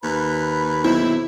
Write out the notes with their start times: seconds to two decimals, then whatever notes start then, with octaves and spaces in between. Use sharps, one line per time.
0.04 D#2 B4 B5
0.84 B1 C3 C4 E4